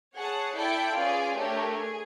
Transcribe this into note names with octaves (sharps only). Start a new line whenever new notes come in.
G#4 C#5 F#5 A5
E4 A4 D5 G5
C#4 F4 G#4 B4 D5
A3 D4 G4 A#4 C#5
G#4